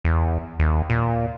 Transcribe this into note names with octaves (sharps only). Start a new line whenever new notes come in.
E2
D#2
A#2